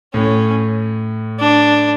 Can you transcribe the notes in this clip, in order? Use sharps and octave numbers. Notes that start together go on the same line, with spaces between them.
A2 C#4
D4